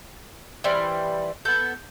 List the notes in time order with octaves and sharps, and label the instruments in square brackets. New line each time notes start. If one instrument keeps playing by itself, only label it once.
[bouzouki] E3 G3 C5 [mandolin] F6
[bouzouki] B3 A4 [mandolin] G6